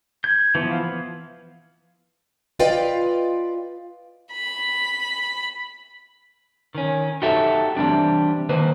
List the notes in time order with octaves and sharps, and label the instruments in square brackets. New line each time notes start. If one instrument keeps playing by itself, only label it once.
[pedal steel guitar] G6 [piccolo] G#6
[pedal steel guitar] E3 F3 B3
[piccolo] F5
[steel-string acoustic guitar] F4 B4 D5 D#5 F5 G5
[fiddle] B5
[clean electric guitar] D#3 C#4
D#4 F#4 G4 A4 E5
E3 G3 A#3 C4 D4
D#3 A#3 B4 C5